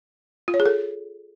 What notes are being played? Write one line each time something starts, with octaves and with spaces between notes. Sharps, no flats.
F4
C#5
G#4
A4